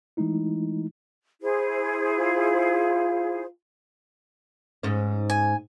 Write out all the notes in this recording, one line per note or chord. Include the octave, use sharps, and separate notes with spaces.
E3 G#3 A3 D#4 E4
E4 G#4 C5
F4
G#2 C#4
G#5